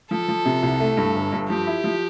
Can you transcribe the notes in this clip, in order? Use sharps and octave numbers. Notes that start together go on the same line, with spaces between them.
F3 A4
F3
C3
C2
A3
G2
G1
G2
F3 G4
E4
F3